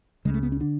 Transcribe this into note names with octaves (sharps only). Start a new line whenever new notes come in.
C#2 C#3 G#3
A3
B3
C#4
D3 D4